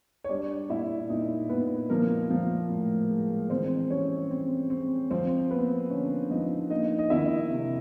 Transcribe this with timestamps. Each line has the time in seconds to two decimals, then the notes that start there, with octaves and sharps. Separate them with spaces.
0.24 C#5
0.29 G3 D4 D5
0.70 A#2 E4 E5
1.09 A#2 D#4 D#5
1.49 A#2 B3 B4
1.90 F3 A#3 A#4
2.30 F3
2.70 A2
3.10 G#3
3.50 E3 C4 C5
3.90 G3 C#4 C#5
4.31 C4
4.70 C4
5.10 F3 C4 C5
5.51 A#3 B3 B4
5.90 D3 C#4 C#5
6.31 F3 D#4 D#5
6.70 A#3 D#4 D#5
6.99 D#5
7.10 D#3 E4 E5
7.51 C3